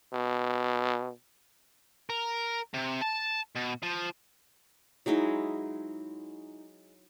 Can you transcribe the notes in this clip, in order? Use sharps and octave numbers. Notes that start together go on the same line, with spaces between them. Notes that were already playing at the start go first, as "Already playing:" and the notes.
B2
A#4
C3
A5
B2
F3
F#3 G#3 D#4 E4